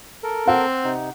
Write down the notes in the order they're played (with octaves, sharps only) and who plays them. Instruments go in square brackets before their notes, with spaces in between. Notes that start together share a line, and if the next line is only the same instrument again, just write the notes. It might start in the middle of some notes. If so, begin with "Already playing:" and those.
[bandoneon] A4 A#4
[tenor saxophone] C4 [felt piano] F#5
[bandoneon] C3 D#4